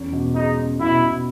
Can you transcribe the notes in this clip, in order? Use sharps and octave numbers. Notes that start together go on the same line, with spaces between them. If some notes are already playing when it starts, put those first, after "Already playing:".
Already playing: E2 C#4
B2
G#3 D#4
C#4
B2 E4
B2